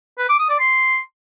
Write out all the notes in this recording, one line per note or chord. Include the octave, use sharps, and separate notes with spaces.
B4
D6
D#6
D5
C6